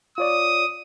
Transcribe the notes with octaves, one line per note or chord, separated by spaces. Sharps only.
F4 C#5 D5 D#6